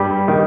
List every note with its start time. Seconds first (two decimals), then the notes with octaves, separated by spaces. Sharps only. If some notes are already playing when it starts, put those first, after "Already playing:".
Already playing: G2 G3 G4
0.28 D#3